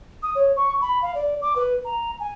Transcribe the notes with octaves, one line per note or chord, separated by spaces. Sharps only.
D#6
C#5
C#6
B5
F5
D5
D6
B4
A#5
G#5